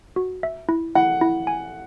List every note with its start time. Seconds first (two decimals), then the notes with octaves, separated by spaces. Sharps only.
0.16 F#4
0.43 E5
0.69 E4
0.95 E4 F#5
1.21 E4
1.47 G#5